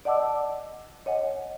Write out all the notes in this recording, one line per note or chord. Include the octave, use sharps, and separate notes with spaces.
D5 D#5 F#5 A5 D6 E6
C#5 D#5 F#5 G#5